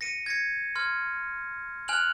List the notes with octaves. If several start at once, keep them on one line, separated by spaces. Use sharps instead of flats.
A#6 C#7 D#7
G#6 A#6 C#7
C6 F6 G#6
G#5 F6 F#6 F7 F#7